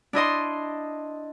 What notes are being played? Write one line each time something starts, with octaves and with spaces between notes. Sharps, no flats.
D4 E4 D#5 C6